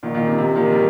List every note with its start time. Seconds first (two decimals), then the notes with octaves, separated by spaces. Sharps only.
0.03 A#2 D#3
0.14 A#2 D#3
0.27 C3
0.38 C3
0.55 A#2 D#3
0.72 D#3 G3